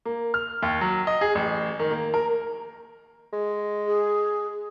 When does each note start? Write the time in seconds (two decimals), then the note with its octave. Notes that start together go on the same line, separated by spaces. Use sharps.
0.05 A#3
0.34 F6
0.62 D#2
0.81 F#3
1.07 D#5
1.21 G#4
1.35 A1
1.79 D#3
1.91 A#3
2.14 A#4
3.33 G#3
3.87 G#4